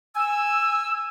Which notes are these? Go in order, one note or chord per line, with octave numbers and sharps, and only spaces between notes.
G#5 E6